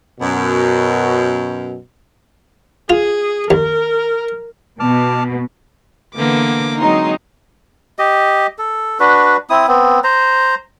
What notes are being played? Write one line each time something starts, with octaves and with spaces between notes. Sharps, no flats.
F#2 B2
F4 G#4
D#2 A#4
B2 A5 D6 F6
D3 E3 A#3 B3 D6
F#3 G#3 C4 D#4 C6
G4 D#5
A4
D4 F#4 B4
C4 E4 D#6
B3 C4
C5 A#5